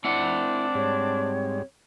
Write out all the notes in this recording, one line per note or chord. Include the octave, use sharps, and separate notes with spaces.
C4 D4 E4 F#5
G#2 G3 C#5